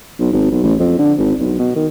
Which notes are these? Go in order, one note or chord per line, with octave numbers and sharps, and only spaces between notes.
B1
G#1
B1
A1
F2
D3
G#1
B1
B2
D#3